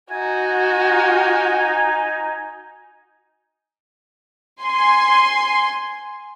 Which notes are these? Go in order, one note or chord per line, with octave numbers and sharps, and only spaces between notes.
D#4 F#4 G#5
G#5 C6